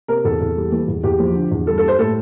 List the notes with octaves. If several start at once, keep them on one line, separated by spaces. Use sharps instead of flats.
C3 A#4
E2 A4
E2
G3
E3
E2
E2 G4
F3
D3
E2
G2 A4
A4
G3
C5
A2 A4